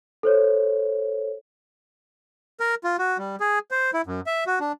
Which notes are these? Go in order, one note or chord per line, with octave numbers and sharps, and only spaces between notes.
A4 C5 C#5
A#4
F4
F#4
G3
G#4
C5
E4
F#2
E5
F#4
D4